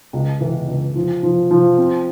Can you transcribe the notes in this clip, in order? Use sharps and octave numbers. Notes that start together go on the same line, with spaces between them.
C#2
E3
C#2
F3
F3
F3
C4